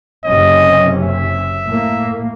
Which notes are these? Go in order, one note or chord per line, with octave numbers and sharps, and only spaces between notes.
F#1 C3 C#4 D#5
E5
A2 A#3